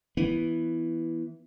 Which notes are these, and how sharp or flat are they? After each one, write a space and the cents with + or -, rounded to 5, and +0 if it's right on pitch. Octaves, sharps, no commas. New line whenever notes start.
E3 +0 B3 +0